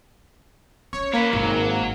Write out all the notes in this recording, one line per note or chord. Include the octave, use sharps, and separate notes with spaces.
C#4 C#5
A#3 B4 C#5
G#1 F#3